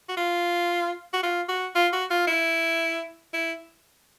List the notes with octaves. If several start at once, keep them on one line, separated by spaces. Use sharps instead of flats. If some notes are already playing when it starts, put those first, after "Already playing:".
F#4
F4
F#4
F4
F#4
F4
F#4
F4
E4
E4